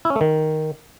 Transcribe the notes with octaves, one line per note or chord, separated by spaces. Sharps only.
E4
C#4
A3
D#3